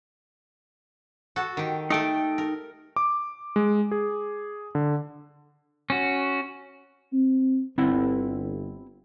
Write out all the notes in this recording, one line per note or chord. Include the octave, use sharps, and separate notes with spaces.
F#4 A4
D#3 G4
A3 D#4 A4 G5
A#4
D6
G#3
G#4
D3
C#4 F#4
C4
G1 C4 E4 F#5